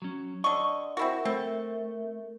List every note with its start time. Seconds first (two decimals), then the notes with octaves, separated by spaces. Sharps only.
0.02 F#3 C#4
0.44 D3 D#5 C#6
0.97 C4 E4 F#4 A#4 E5
1.25 A3 C4